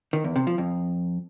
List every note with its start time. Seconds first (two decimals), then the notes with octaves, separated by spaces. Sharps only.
0.13 D#3
0.24 E2
0.36 C3
0.47 F3
0.58 F2